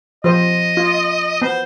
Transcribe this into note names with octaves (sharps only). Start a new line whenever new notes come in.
F3 C5 D#5
F4
B3 C5